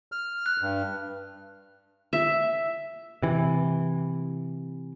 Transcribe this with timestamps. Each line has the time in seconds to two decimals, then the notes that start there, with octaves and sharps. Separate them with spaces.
0.12 F6
0.46 F#6
0.62 G2
2.13 E5
3.22 C3 E3